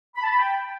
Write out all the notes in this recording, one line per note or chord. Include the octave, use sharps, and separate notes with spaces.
B5
A5
B5
G5